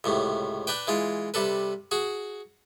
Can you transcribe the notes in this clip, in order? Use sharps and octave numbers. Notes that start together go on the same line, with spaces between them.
C#2 A2 C3
D4 B4 G5
E3 G#3 F4
C3 G3 A4 B4
F#4 G#4